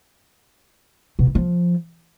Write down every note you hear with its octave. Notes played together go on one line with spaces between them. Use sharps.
B2
E3
F3